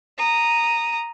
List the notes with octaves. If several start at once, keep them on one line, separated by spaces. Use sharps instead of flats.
A#5 D#6